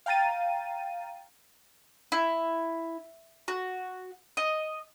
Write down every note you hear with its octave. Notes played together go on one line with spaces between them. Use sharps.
F5 G5 A#5 A6 D#7
E4
F#4
D#5